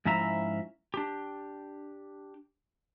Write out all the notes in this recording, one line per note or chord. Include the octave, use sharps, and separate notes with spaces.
G#2 F3 C#4 E4 E5 A#5
D4 G4